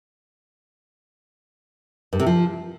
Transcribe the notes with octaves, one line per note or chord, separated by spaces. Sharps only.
G2
C3
F3